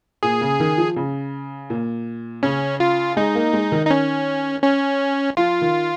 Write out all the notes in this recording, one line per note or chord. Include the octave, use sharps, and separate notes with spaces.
A#2 G#4
C#3
D#3
F3
C#3
A#2
C#3 C#4
F4
G#3 D#4
A#3
G#3
D#3
D#4
C#4
C#4
F3 F4
D#3